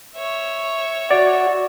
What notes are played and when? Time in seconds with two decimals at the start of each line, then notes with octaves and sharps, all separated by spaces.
0.15 C#5 E5
1.11 F#4 D5